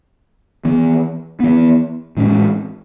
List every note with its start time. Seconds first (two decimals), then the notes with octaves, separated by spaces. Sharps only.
0.65 E3 B3
1.40 E3 B3
2.17 A2 E3 G#3 C#4